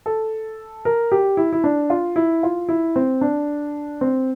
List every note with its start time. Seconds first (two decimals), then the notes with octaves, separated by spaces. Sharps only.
0.06 A4
0.85 A#4
1.12 G4
1.37 E4
1.53 E4
1.64 D4
1.90 F4
2.16 E4
2.43 F4
2.69 E4
2.96 C4
3.21 D4
4.01 C4